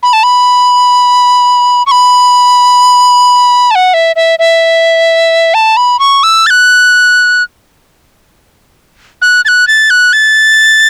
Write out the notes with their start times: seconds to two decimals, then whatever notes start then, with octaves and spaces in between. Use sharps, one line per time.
0.03 B5
0.13 A5
0.23 B5
1.87 C#6
1.91 B5
3.71 A5
3.75 F#5
3.94 E5
4.16 E5
4.39 E5
5.54 A5
5.77 B5
5.99 C#6
6.23 E6
6.47 A6
6.50 F#6
9.22 F#6
9.45 A6
9.48 F#6
9.68 A6
9.90 F#6
10.13 A6